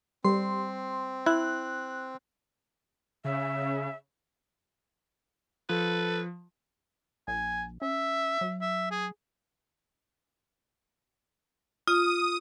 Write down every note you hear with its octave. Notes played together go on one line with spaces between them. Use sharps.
G3 C4 C6
E4 F#6
C#3 E5
F3 A4 B4
A#1 G#5
C#4 E5
F#3
E5
G#4
F4 D#6